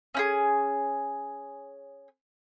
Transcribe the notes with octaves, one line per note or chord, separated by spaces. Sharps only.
C#4 E4 G#4